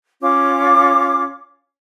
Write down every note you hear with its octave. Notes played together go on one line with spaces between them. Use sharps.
C#4 F4 D6